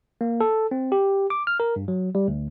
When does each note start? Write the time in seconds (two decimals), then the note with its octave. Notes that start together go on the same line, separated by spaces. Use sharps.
0.21 A#3
0.41 A4
0.71 C4
0.92 G4
1.30 D6
1.47 F6
1.60 A#4
1.76 G2
1.88 F#3
2.15 G3
2.28 D2